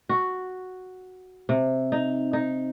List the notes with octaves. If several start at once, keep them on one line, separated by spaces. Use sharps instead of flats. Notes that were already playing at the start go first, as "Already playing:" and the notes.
F#4
C3
D#4
D#4